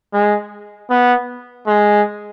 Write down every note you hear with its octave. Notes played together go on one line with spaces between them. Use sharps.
G#3
B3
G#3